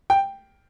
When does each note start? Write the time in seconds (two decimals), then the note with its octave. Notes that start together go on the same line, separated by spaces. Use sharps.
0.10 G5